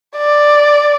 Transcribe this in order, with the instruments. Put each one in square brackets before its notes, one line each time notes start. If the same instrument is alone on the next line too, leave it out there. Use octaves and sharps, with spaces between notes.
[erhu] D5